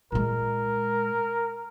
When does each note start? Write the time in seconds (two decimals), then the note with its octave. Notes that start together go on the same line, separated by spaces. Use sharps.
0.12 A#2 G#3 A#4